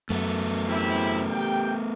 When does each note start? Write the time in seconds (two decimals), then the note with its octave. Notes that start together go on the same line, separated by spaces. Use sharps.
0.10 F#2 A3 B3
0.68 C4 E4 G4
1.31 G4 G5